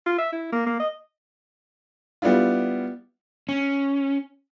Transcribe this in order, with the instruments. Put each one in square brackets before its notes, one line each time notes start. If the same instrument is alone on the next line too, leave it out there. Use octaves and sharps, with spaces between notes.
[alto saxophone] F4
E5
E4
A#3
A#3
D#5
[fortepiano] G3 B3 D4 E4 F4
[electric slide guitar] C#4